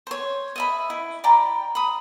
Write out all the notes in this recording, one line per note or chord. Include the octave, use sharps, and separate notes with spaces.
C5 C#5
D#5 E5 B5
E4
D5 G5 A#5 B5
B5 D#6